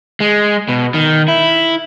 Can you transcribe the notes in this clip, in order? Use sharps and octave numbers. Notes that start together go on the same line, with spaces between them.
G#3
B2
D#3
E4